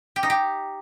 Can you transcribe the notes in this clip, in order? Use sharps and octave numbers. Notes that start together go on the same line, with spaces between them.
G4
D#4
G4